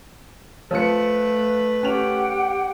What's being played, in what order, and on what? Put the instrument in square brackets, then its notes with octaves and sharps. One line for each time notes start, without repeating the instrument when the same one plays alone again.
[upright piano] F3 C#7 [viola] A3 B4
[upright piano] C#4 F7 [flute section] G4 F#5 G5